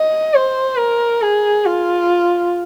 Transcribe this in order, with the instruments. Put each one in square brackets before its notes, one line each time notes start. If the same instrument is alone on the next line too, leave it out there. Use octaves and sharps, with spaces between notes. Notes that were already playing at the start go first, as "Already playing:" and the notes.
Already playing: [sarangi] D#5
C5
A#4
G#4
F4